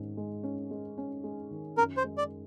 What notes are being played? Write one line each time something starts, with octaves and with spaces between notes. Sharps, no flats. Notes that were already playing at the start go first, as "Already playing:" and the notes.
Already playing: G#2 D#3 C#4
G#3
C#4
G#3
C#4
G#3
D#3
F#2 A#4
C5
G#3
D5